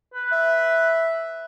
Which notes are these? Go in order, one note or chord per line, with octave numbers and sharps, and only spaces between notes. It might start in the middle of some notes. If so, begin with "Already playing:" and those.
B4
E5